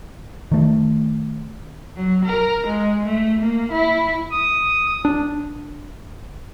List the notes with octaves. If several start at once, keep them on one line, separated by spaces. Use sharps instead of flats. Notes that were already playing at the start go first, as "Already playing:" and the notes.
D#3 A3
F#3
A#4
G#3
A3
A#3
E4
D#6
D4